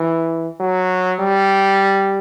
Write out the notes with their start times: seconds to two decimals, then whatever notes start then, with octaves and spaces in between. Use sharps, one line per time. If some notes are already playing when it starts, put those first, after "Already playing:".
Already playing: E3
0.60 F#3
1.20 G3